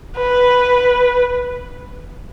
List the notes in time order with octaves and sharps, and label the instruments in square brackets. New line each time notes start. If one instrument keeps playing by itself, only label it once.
[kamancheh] B4